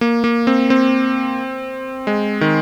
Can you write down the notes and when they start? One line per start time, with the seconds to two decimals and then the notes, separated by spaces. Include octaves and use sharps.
0.01 A#3
0.24 A#3
0.47 C4
0.70 C4
2.07 G#3
2.41 D#3